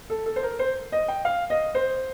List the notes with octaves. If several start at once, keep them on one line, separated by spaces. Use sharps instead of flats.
A4
A4
C5
A#4
C5
D#5
G5
F5
D#5
C5